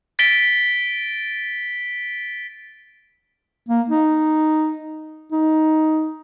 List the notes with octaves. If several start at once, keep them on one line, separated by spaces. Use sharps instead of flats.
A6 B6 D7 G7
A#3
D#4
D#4